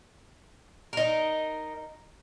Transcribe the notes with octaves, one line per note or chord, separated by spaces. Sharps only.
D#4 A#4